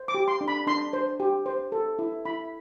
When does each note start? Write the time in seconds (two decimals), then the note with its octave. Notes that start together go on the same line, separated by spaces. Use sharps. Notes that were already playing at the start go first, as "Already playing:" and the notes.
Already playing: C5
0.08 D6
0.15 G4
0.28 C6
0.41 D4
0.48 B5
0.67 D4 C6
0.93 C5
1.20 G4
1.46 C5
1.72 A4
1.99 E4
2.25 E4 B5